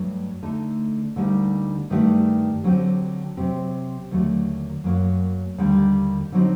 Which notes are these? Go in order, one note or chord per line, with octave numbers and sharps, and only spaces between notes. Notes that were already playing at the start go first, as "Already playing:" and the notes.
Already playing: G2 F#3 A3
D3 A3 D#4 A4
D2 D3 G3 A#3 D#4
G2 D#3 A3 D4 G4
D3 F#3 C4 G4
C3 F#3 C4 G4
D#2 D3 F#3 A3
F#2 F#3 A#3
D#2 D3 G3 A#3
D3 F#3 C4 D#4